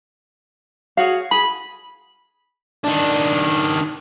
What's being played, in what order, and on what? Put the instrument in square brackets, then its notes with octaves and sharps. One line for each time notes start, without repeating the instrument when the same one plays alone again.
[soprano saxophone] F#4 [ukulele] G#4 C#5 F5
[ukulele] G#4 [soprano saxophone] B5
[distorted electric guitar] D#3 D4